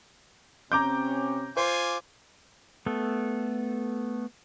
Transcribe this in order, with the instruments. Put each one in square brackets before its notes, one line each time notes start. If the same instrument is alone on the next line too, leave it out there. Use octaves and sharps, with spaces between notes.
[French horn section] C3 C4 C#4 [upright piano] A#5 D6 G6
[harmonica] F4 G#5 D6 [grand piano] C5
[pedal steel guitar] A3 B3 A4